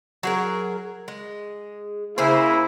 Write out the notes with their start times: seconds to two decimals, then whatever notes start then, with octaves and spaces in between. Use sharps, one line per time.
0.23 F#3 G#4 A#4
1.08 G#3
2.18 C#3 A#3 E4 G#4 C5